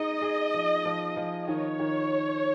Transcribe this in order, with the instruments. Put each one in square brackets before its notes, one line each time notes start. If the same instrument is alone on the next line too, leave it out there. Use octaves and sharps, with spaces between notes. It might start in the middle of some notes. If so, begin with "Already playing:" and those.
Already playing: [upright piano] D#4 G#4 [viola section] D#5
[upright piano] G#4
F3
F3
F3
[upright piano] D#3 [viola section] C#5
[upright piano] D#3